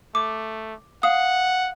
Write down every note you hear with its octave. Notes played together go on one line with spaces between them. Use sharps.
A3 D6
F5 F#5 D#6